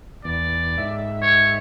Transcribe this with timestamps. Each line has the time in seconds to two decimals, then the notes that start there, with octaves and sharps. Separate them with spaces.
0.25 E2 D5
0.78 G#2 E5
1.22 C#5